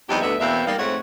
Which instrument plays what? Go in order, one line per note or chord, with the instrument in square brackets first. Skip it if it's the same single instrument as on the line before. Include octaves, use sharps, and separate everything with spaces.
[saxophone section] E2 F#3 G#3 C4 D#4 G4
D2 D3 B3 E5
E2 B2 A#3 C4 E5
G3 A#3 D#4
F2 G#2 A3 C#5 F#5